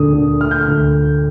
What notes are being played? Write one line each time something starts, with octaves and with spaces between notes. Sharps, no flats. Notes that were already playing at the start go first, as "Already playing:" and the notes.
Already playing: D2 A#2 D3 D#6
D3
A3 F6
G6
F6
D2
A3